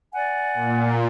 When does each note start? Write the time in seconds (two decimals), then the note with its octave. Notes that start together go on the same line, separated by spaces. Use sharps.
0.13 D5 F#5 G#5
0.54 A#2